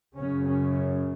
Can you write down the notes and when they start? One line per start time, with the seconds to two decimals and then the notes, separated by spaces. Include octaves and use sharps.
0.16 F#2 C#3 C#4
0.46 C#4